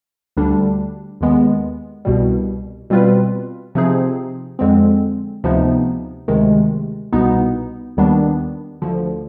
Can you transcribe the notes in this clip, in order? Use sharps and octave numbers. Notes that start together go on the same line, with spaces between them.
D2 D3 G3 D4
D#2 D#3 G#3 B3
C2 B2 G3
B2 G3 C4 F4 B4
C3 F3 C4 D#4 G#4
F2 D3 G#3 C4
D2 C3 F3 B3 D#4
D2 C3 D#3 G#3
C2 B2 B3 D#4
D#2 D#3 G3 B3 D4
D2 D3 F3